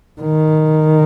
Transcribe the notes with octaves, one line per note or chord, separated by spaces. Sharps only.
D#3